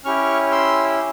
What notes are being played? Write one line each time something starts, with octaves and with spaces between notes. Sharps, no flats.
C#4 E4 G4 C#6 F6
C6 E6